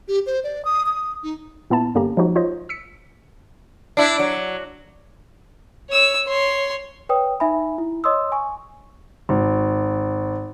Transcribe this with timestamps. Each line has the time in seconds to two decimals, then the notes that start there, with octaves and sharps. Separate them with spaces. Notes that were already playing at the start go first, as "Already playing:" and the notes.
0.08 G4
0.26 C5
0.44 D5
0.65 D#6
0.86 D#6
1.23 D#4
1.70 A#2 B3 E4 A5
1.95 G2 D3 A#3 C#4 G4 A#5
2.17 F3 F#3 G#3 D#4 F#4
2.36 F4 C5 C#5 D#5
2.69 E6 B6 C#7
3.97 D4 E4
4.19 F#3
5.90 C#5 E6
6.27 C#5 C6
7.09 B4 C#5 G5 D#6
7.40 D#4 E5 G#5 B5
7.78 E4
8.04 C#5 D#5 C6 D#6 E6
8.32 G#5 C#6
9.29 G#1